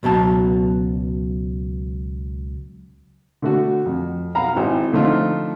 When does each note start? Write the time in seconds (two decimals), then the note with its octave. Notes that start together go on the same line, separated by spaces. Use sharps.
0.03 C#2 B2 F#3 A5
3.42 D3 A3 F#4
3.86 F2
4.35 B1 F5 F#5 A#5 B5
4.53 G#1 C4 E4
4.93 D3 F3 A3 C4 D#4 F4